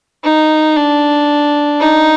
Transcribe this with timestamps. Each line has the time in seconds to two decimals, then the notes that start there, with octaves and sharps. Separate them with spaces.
0.24 D#4
0.76 D4
1.80 D#4